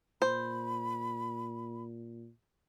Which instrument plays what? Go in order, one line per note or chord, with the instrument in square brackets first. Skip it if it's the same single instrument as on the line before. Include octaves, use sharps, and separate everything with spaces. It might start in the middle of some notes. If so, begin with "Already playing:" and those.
[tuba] A#2 [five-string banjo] C5 [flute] B5